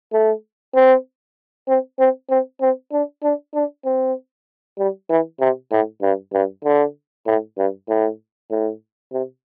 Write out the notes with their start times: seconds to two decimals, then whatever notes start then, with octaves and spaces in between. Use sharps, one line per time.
0.13 A3
0.75 C4
1.68 C4
1.99 C4
2.30 C4
2.61 C4
2.92 D4
3.23 D4
3.54 D4
3.85 C4
4.79 G3
5.10 E3
5.40 C3
5.71 A2
6.02 G2
6.33 G2
6.64 D3
7.26 A2
7.58 G2
7.88 A2
8.51 A2
9.12 C3